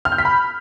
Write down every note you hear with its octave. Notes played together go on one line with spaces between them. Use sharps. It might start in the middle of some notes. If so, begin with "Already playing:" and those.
F6
G6
B6
B5